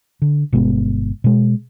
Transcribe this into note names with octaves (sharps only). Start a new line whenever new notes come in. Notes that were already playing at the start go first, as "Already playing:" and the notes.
D3
G1 B2 G#3 B3
B2 G#3